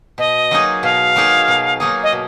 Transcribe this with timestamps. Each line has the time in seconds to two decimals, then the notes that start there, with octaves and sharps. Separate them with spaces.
0.18 B2 D#5
0.51 F#3 A#3 D#4 G#4
0.83 B2 F5
1.16 F#3 A#3 D#4 G#4
1.48 B2
1.80 F#3 A#3 D#4 G#4
2.03 D#5
2.12 B2